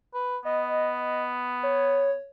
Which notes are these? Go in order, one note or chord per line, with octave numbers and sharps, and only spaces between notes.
B4
B3 D#5
C#5